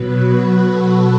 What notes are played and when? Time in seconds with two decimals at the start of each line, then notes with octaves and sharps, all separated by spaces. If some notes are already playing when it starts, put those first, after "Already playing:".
Already playing: B2 F#3 B4
0.11 F#4
0.61 A4